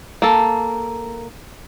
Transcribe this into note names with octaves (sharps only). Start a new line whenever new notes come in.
A#3 A4